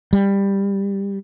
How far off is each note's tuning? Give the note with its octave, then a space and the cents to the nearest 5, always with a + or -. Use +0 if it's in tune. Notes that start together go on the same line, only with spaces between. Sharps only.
G3 +15